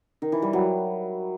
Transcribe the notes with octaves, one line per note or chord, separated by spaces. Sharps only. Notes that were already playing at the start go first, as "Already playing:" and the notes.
D#3
E3
G3
F#3